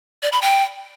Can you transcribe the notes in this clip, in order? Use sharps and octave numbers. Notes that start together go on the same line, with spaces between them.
D5
B5
G5